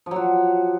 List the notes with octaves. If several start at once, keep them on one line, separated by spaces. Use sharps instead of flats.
F3 F#3 F#4